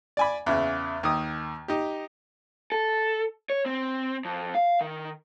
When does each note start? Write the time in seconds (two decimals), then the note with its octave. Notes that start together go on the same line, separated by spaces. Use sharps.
0.17 D5 G#5 B5
0.46 E2 C#3 E3
1.03 D#2 D#3 D#6
1.68 D#4 G4
2.72 A4
3.50 C#5
3.66 C4
4.25 F2
4.55 F5
4.81 D#3